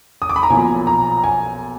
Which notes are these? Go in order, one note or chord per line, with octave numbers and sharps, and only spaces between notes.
D#6
D6
B5
A#5
B1 A#2 F3 G#5
A#5
G#5